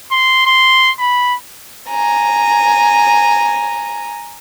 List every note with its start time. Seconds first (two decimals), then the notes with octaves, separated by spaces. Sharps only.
0.12 C6
0.46 C6
0.99 B5
1.90 G#5 A#5